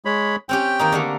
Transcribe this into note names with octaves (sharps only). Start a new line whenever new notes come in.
G#3 C#5 B5
C4 C#4 G4 G5
D#3 A#3 D#4
D3 A3 A#3